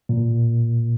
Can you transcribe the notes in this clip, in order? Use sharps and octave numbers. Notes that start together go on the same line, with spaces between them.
A#2